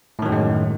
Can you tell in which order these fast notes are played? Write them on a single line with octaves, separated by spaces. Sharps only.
A2 D#3 F#3 F#2 G#3